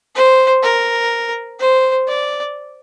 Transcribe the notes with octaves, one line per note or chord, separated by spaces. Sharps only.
C5
A#4
C5
D5